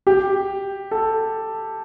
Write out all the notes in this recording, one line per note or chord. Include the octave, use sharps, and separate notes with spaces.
G4
A4